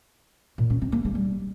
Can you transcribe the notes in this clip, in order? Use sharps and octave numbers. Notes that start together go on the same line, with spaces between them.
A#2
C#4
C4
A#3
G#3
G3